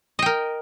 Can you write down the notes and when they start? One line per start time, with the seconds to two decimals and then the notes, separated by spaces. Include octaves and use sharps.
0.19 D#5
0.22 G5
0.26 A#4